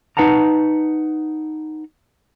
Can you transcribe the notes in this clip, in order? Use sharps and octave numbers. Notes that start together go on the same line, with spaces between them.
D#4 B4 F#5 A5 A#5